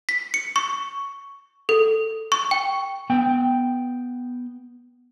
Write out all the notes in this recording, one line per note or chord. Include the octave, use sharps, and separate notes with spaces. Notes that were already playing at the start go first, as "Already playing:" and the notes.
B6
C#7
C#6
A4
C#6
G5
B3 G5